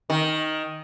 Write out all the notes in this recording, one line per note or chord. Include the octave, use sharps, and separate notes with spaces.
D#3